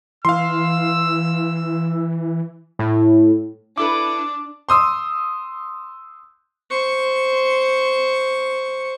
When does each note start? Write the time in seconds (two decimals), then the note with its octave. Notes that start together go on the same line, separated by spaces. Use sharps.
0.25 E3 F5 C6 E6
2.79 A2
3.78 D4 E4 A4 B4 D6
4.69 C6 D#6 E6
6.70 C5 C#6